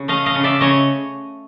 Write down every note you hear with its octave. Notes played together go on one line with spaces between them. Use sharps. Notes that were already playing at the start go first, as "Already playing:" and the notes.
Already playing: C#3
A3 D#5 F5
D#5 F5
C#3
D5 E5
C#3 C#5 D#5